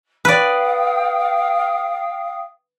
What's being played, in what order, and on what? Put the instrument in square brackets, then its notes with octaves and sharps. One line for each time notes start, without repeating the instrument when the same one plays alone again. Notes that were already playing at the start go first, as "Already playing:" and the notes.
[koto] B4 D5 [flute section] F5 G5 D#6